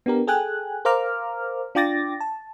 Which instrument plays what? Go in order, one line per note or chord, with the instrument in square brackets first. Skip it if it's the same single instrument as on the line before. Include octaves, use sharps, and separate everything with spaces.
[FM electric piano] B3 D4 G4 A#4
G#4 A4 G5 G#5 F#6
A#4 C5 F5 A#5 D6 F6
D4 F4 G5 D6 A6 A#6
A5